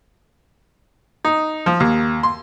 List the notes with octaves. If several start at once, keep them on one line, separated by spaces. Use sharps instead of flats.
D#4
F3
D#2
C6